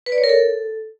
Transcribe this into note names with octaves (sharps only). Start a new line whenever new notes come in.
B4
D5
C#5
A#4
A4